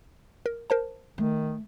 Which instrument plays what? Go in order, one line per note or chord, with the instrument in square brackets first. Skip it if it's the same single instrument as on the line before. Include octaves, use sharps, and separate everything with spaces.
[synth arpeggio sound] A#4
A#4 C5 A5
[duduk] D#3 [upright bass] A3